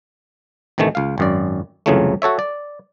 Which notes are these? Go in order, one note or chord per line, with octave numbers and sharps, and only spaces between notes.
A1 C3 D#3 E3 A3
C#2 F5
G#1 F#2 D5
C2 F2 C#3 E3 F#3 A3
F#4 A4 C#5 E5
D5